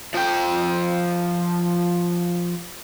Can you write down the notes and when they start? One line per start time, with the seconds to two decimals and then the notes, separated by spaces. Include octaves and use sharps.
0.14 F3 G5